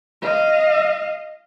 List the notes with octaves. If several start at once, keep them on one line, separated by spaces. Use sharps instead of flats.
D#5 F5